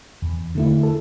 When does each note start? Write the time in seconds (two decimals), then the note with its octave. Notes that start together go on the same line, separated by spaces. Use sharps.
0.22 E2
0.55 D3 A3 E4
0.83 A4